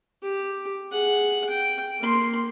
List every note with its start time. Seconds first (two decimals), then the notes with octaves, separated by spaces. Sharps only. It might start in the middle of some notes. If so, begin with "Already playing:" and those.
0.23 G4
0.91 G#4 F#5
1.49 G5
2.00 A#3 C6